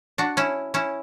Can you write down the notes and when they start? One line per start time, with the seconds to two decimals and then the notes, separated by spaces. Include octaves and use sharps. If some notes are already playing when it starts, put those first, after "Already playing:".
0.18 D4 F#4
0.37 C#4 E4
0.74 C#4 E4